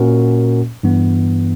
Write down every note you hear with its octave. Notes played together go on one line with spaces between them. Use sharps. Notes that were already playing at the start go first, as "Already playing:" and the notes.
Already playing: A#2 A#3 C#4 F#4 A#4
G2 E3 B3